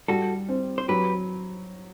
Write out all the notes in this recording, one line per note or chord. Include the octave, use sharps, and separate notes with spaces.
G3 F#4 A4
C4
C5
F#3 G4 B4